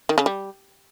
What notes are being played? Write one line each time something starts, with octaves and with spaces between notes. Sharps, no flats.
D#3
C#3
G3